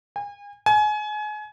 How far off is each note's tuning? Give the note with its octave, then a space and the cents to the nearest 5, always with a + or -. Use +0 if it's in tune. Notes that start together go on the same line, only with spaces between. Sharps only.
G#5 -35
G#5 +30